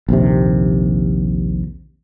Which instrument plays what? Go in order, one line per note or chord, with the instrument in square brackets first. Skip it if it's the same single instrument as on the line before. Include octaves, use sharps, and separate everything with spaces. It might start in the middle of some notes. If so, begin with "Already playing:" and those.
[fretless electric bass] A#1 D#2 C3